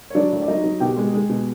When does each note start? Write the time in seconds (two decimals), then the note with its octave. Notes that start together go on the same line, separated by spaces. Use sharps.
0.10 C#5
0.15 F#3 D4 D5
0.32 A2
0.41 D5
0.48 F#3 D#4 D#5
0.64 F#3
0.80 B2 G4 G5
0.97 G#3
1.14 G#3
1.29 B2